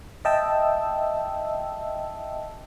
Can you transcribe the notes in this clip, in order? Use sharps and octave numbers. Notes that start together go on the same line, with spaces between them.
D#5 E5 G5 A5 E6